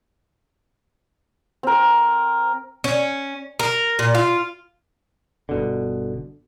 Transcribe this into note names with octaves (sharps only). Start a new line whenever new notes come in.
C4 A#4
C#4
A#4
A#2
F4
G1 B2 D3